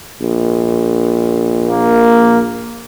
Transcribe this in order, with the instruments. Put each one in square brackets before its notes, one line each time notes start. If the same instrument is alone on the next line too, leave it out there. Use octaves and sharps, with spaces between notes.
[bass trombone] A#1
[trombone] A#3